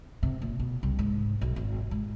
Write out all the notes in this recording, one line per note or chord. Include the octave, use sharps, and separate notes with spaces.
C3
A#2
B2
C2
G#2
B1
G#1
G#2